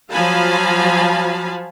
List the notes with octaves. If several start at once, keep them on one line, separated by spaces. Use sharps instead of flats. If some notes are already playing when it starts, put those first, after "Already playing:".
F3 F#3 F5 G#5 A5 B5